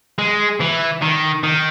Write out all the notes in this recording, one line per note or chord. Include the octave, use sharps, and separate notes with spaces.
G#3
E3
D#3
D#3